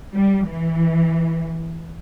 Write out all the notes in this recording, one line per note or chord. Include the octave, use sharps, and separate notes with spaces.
G3
E3